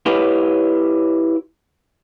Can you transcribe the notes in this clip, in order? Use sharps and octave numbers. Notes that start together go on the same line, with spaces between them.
E4 G4 B4 C#5 D#5 F5